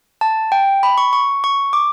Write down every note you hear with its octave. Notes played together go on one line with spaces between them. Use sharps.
A5
G5
B5
C#6
C#6
C#6
D6